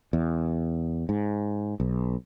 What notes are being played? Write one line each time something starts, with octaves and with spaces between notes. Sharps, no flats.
E2
G#2
B1